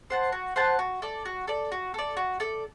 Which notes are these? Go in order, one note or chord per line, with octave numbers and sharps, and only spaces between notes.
C5 F#5 A5
F#4
C5 F#5 A5
F#4
A4 D5
F#4
A4 D5
F#4
A4 D5
F#4
A4 D5